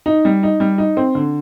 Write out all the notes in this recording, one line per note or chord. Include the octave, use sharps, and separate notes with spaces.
D#4
G3
D#4
G3
D#4
C4
D3